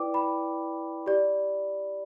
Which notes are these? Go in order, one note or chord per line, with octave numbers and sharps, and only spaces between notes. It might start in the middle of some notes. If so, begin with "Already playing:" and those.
Already playing: E4 B4 D5 G5 D6
B5
G4 D5